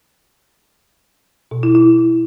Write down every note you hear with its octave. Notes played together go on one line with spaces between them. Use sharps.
B2
E4
E4